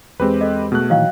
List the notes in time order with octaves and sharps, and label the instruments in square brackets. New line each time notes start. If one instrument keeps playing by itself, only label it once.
[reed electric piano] E2 G#3 [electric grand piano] C4 G4 B4
[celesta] A4 D#5
[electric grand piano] B2 A3 F#6 [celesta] G#4
[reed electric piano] A#2 D#3 E3 [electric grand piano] F#3 [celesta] D#5 F5 G5